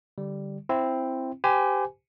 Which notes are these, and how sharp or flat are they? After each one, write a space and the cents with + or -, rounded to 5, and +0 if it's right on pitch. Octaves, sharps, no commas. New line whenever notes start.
D3 +0 G3 +0
C4 +5 E4 +10
G4 +0 C5 -40 G#5 +0